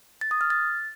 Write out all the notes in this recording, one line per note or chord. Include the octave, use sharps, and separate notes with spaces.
A6
D#6
F6
A6